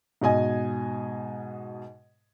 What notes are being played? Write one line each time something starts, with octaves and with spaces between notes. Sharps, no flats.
G#2 B2 D#5 G#5